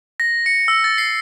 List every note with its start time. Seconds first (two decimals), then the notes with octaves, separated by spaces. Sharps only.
0.20 A#6
0.46 C#7
0.68 E6
0.84 A6
0.98 C7